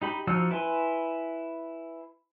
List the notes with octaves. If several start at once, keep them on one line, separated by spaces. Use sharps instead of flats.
D#4 G4 B5
F3 D#4 F#4 E6 F6
E4 B4 G#5 C6